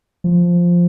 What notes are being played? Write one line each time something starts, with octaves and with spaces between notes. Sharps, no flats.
F3